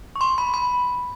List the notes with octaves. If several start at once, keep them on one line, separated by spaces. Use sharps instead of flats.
C#6
C6
B5
B5